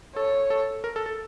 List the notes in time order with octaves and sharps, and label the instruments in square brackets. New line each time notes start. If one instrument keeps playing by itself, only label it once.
[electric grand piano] A4 [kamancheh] C#5
[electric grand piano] A4
A#4
A4
A4